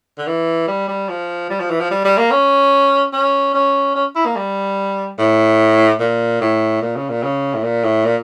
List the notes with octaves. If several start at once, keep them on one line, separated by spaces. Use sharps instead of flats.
D3
E3
G3
G3
F3
G3
F3
E3
F3
G3
G3
A#3
C#4
C#4
C#4
C#4
E4
A#3
G3
A2
A#2
A2
A#2
C#3
A#2
C#3
A2
A#2
A2
A#2